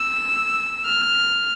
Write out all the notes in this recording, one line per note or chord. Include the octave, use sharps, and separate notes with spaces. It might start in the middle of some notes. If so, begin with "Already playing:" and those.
Already playing: E6
F6